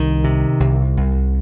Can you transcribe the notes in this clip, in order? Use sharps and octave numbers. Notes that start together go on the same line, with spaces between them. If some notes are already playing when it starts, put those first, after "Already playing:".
Already playing: C2 D#3
C3
C2
C2